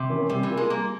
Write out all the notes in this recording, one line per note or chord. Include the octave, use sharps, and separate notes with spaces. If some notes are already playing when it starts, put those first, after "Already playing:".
Already playing: C3
E3 A#3 C#4
C3 G3
E3
A#3 F4
G#3
G3 A#3